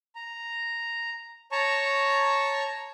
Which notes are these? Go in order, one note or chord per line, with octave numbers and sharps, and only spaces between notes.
A#5
C#5 A5 A#5 C#6